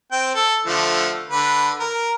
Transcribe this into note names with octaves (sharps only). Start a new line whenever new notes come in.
C4 G5
A4
D3 F3 A3
D3 B4
A#4